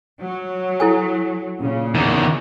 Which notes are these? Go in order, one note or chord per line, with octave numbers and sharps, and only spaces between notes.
F#3
E4 A4 G#5
A#2 C#3
E2 D#3